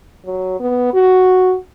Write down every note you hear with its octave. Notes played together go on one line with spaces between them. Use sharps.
F#3
B3
F#4